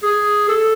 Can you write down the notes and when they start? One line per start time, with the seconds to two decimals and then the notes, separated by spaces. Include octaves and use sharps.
0.03 G#4
0.48 A4